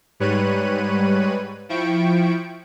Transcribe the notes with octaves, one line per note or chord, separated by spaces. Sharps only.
G#2 G3 B4 C#5 F#6 D#7
F3 E4 G5 C#6 D7